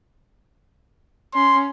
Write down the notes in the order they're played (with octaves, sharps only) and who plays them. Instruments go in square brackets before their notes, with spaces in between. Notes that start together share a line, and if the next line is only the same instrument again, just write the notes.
[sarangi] C#4 [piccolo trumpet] C6